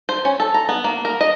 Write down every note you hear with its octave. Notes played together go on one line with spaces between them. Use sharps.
C5
C#4
A4
A#5
B3
A#3
A#4
D#5